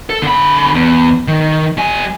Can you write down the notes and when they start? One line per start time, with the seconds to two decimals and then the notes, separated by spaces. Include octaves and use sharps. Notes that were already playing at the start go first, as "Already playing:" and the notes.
0.10 A4
0.23 D3 B5
0.75 E2
1.28 D#3
1.77 G3 G#5